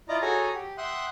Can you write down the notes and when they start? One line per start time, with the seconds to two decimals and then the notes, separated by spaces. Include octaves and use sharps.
0.09 E4 F4 D5 D#5 A#5 D6
0.22 F#4 G#4 A4 C#5 G#5 A#5
0.54 G4
0.77 E5 F#5 G5 C6 D#6 F#6